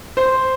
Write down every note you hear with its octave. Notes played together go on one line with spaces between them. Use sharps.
C5